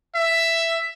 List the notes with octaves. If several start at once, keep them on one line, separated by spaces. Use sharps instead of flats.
E5